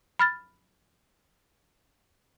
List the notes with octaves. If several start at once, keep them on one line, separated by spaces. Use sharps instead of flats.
B5 F6 A6